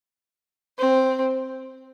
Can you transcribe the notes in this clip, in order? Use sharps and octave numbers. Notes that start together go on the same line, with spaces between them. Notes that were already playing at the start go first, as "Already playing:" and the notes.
C4